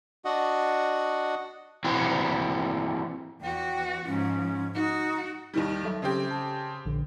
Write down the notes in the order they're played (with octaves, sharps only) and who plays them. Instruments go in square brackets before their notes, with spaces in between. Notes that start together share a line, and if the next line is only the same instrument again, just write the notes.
[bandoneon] D4 F#4 D#5 F#5
[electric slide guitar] E3 C4 E4 F#4
[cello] E2 F#4 [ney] G5
[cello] G#2 F3 [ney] C#4
[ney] D#4 [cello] F#4
[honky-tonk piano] D#2 D#3 G3
[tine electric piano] F#3 A4 E5
[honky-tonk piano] C#3 C4 G4
[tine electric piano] A5
A#1 D3